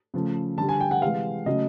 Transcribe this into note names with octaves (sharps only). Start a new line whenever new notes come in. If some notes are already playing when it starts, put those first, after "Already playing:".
C#3 F3 A3
D3 G3 A5
G#5
G5
F#5
C3 E3 G#3 F5
C#3 F#3 A3 D#5